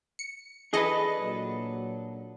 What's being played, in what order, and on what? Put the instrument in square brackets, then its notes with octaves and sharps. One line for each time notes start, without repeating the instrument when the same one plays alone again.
[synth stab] C#7
[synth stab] E3 G#4 D#5 [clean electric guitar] D4 A4 B4
[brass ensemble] A#2 F#3